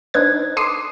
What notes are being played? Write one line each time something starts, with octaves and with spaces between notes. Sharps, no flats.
D4 D#4 B4 C5 F#6 G#6
A4 C6 D6 D#6 C7 D#7